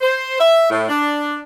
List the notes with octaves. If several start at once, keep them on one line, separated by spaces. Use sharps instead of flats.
C5
E5
A2
D4